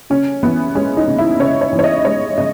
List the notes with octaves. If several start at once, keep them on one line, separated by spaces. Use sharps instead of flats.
C#3 C#4
E3 B3
G#3 C#4
D#4
C#3
E4
C#3 C#5
C#5
E3
C#5
D#5
G#3 C#5
C#3 D#5